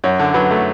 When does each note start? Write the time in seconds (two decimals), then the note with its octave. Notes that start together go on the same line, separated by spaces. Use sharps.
0.04 F#2 C#5
0.20 D3
0.34 F#3 B4
0.51 A3